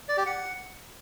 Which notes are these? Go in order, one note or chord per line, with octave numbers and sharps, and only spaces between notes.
D5
G4
F#5